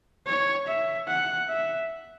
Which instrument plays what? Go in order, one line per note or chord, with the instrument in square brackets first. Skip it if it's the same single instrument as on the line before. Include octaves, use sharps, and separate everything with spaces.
[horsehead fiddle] C#5
E5
F#5
E5